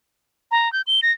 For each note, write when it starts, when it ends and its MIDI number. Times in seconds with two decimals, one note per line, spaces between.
0.51 0.71 82
0.73 0.82 91
0.87 1.00 103
1.03 1.12 94